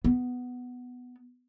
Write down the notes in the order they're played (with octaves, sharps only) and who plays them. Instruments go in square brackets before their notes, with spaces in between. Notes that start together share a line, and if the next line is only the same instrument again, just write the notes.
[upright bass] B3